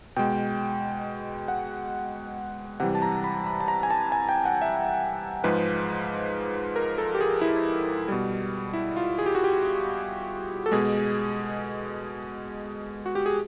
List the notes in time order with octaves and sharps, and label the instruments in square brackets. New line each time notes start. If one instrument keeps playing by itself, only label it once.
[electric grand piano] B2 G#3 G5
F#5
C3 E3 G3 F#5
A5
A#5
B5
B5
A5
A#5
G#5
A5
G#5
G5
F#5
E5
G#2 F3 G#3 B4
A#4
A4
G4
G#4
E4
B2 G3
E4
F4
G#4
G4
F#4
G4
A4
B2 G#3 G#4
F#4
G4
G#4